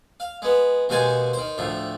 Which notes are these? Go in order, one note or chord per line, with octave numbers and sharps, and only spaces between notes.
F5
G#3 B3
D#2 B2 G#3 C5 G#5 A5
D#3 C5
D2 A2 F3